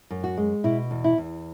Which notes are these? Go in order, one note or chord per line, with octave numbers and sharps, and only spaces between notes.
F#2
F#4
G#3
B2 E4
E2
E4
E2